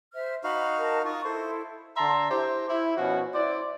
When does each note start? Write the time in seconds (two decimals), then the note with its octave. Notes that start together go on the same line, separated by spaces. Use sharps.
0.14 C5 E5 F6
0.44 D#4 F#4 F5 B5
0.78 A#4 A5
1.05 D#4 F4 C#6 D#6
1.24 E4 A4 C5
1.97 D3 E5 A5 A#5 C6
2.31 E4 G4 C5
2.68 E4
2.97 B2 F3 C#4 F#4
3.34 E4 C5 D5